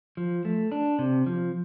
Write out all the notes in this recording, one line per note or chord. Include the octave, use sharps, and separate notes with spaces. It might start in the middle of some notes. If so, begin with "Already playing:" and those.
F3
A3
D4
C3
F3